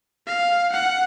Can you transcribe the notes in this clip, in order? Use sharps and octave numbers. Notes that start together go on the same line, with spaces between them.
F5
F#5